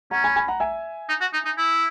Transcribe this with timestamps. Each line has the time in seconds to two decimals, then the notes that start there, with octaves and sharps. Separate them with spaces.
0.11 C#4 F#5 A#5
0.24 G#5 B5
0.36 G#5 B5
0.48 F#5 A#5
0.60 E5 G#5
1.09 D#4
1.21 F#4
1.33 D#4
1.45 D#4
1.58 E4